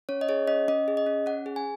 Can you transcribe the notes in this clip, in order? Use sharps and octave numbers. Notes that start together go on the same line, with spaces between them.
C#4 C#5
D#5
G#4 C#5
C#4 D#5
C#4 D#5
G#4
D#5
C#4
C#4 F#5
G#4
G#5